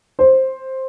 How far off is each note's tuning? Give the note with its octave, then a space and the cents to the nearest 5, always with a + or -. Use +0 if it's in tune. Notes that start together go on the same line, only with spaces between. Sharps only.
C5 +10